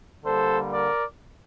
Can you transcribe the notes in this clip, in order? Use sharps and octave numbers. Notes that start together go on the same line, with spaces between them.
D3 G3 A#3 A4 C5
A#4 D5